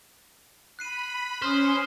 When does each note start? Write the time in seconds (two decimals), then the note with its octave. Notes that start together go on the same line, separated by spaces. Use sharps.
0.79 B5 F#6 C7 D#7
1.42 C#4 C5 D#6 F6